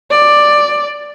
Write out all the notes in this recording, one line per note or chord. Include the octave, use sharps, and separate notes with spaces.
D5